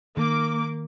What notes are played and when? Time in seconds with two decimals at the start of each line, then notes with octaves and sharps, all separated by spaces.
0.17 D#3 A#3 D6